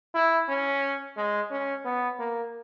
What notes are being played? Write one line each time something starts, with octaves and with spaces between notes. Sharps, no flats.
E4
C#4
G#3
C#4
B3
A#3